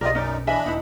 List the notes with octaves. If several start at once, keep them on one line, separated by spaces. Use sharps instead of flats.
B1 F4 G4 A#4 D5 D#5
F#2 C#4 D#4 D5
E3 D4 D#5 E5 G#5 B5
E1 D#4 E4